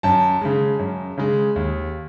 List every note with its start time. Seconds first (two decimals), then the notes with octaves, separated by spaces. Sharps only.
0.03 F#2 A5
0.41 C#3 G#3
0.79 F#2
1.18 C#3 G#3
1.56 D#2